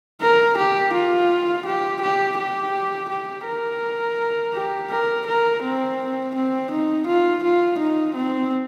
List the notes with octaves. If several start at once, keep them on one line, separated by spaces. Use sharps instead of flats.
A#4
G4
F4
G4
G4
G4
G4
A#4
G4
A#4
A#4
C4
C4
D#4
F4
F4
D#4
C4